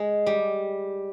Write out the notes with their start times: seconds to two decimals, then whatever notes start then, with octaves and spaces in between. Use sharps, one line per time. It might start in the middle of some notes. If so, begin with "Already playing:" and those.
Already playing: G#3
0.26 G3